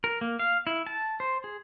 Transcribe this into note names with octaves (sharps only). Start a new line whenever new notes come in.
A#4
A#3
F5
E4
A5
C5
G#4